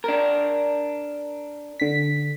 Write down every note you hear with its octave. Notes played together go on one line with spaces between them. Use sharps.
D4 A#4
D3 B6